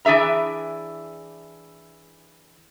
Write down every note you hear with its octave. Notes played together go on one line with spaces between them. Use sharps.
E3 D4 G#4 E5 A#5